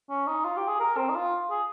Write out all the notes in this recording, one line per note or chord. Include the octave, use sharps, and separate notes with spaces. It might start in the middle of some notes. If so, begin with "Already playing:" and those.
C#4
D#4
F4
G4
G#4
A#4
C4
D#4
F4
G#4